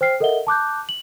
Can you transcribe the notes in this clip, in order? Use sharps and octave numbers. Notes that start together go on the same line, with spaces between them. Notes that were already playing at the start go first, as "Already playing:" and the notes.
C5 G5 F6 C7
A4 A#4 D#5 E5 F#5 G7
A5 D6 F#6 G6
F#7